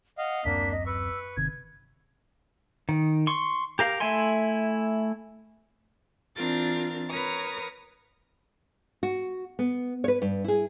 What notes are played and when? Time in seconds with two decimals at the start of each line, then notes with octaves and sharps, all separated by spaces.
0.18 D#5 F5 F#5
0.45 D1 F#2 A#3 C4 D4 B6
0.72 D#5
0.86 B4 C#6 E6
1.37 G1 C3 D#3 G#6
2.89 D#3
3.27 C6 C#6
3.79 G4 A#4 F5
4.00 A3 E4 E5 G#5 C6
6.35 E3 C4 D4 F4 A#4 A6
7.08 A#4 B4 C#5 A#5 D#6
9.03 F#4
9.59 B3
10.04 B4 C#5
10.22 G2
10.44 E4 G#4